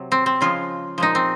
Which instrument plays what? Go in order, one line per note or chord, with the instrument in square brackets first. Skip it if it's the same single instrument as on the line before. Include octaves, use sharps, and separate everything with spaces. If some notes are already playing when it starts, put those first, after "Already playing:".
Already playing: [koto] C3 F#3
C4
C4
C#3 F3 G#3 F4
A#2 F3 G#3 D#4
C4